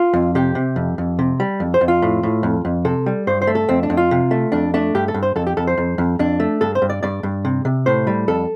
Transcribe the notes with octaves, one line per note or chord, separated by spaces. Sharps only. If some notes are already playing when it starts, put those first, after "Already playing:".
Already playing: F4
F2
C3 G4
C3
F2
F2
C3
G3
F2
C5
F2
F4
A2
A2
F2
F2
C3 A4
G3
G2 C5
C5
A3
A4
F2 C4
D4
F2
F4
C3
A3
F2 D4
A3 D4
G2 G4
A4
G2
C5
F2 A4
G4
F2 A4
C5
F2
F2
F2 D4
A3
G2 A4
C5
G2
D5
G2 D5
G2
C3
C3
A2 C5
G3
F2 A4